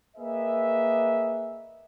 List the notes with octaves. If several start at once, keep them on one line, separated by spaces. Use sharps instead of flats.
A#3 G#4 B4 D#5 E5